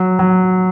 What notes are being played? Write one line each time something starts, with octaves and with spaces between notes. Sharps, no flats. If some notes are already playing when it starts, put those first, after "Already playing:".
Already playing: F#3
F#3